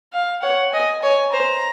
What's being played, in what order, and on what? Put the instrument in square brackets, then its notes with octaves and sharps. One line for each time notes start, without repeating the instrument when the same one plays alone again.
[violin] F5
[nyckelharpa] C#5 [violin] F#5
[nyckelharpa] D#5 [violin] G#5
[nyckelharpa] C#5 [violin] G#5
[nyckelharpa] C5 [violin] A#5